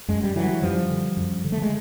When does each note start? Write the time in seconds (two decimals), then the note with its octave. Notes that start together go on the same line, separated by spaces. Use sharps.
0.08 F#2 G#3
0.23 G3
0.35 D3 E3 F#3
0.62 F#2 F3 G3
0.91 D3
1.17 F#2
1.44 D3
1.52 A3
1.62 G#3